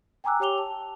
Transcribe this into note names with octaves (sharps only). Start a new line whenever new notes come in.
G5 G#5 A#5 D6 E6 F#6
G4 C#5 G5 D6 F7 G7
A5